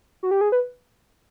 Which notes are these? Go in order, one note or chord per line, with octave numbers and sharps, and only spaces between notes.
F#4
G4
G#4
B4